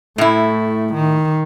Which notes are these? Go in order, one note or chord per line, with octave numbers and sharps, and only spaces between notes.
A2 A3 E4
D#3